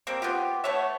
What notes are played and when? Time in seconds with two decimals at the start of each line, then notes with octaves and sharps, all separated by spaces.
0.07 G3 A#3 C4
0.22 B3 C4 F4 G4
0.64 A3 B3 C#5 E5